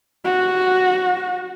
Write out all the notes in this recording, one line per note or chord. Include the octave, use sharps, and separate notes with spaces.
F#4